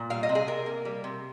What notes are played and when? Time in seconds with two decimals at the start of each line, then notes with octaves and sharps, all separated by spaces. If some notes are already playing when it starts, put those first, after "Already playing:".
Already playing: A#2
0.10 G3 F5
0.23 D#5
0.29 C3
0.35 G#4
0.47 C3 A#4
0.66 A#3
0.85 G3
1.04 C3